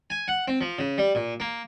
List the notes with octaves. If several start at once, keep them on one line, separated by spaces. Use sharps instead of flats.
G#5
F#5
C4
F3
C#3
G3
A#2
A#3